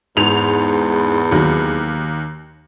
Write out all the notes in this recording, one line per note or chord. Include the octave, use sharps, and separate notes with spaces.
E2 G#2 F7
D#2 F#3